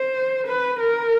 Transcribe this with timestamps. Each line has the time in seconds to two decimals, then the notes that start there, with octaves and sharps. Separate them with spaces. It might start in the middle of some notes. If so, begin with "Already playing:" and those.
Already playing: C5
0.47 B4
0.80 A#4